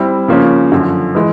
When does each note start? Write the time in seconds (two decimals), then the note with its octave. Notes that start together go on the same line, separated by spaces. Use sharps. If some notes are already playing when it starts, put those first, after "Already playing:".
Already playing: G3 C4 E4
0.28 C#3 F3 A#3 C#4
0.72 F#2 D3 F3
1.15 E3 G#3